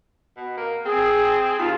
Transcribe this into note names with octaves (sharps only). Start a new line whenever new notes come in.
B2
A#3
C4 G#4
D#2 F4